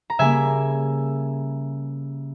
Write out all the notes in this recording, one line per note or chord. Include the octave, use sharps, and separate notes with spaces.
A#5
C#3 G3 A#3 E5 G#5